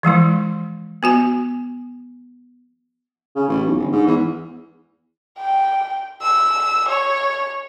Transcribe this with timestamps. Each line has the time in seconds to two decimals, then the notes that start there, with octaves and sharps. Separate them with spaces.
0.03 E3 F3 G#3 E4
1.03 B3 F#4 G#5
3.35 C#3
3.48 A1
3.65 B1
3.78 G1
3.92 G#2
4.06 E2
5.39 G5
6.22 E6
6.89 C#5